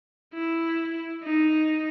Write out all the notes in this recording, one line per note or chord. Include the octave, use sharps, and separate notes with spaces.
E4
D#4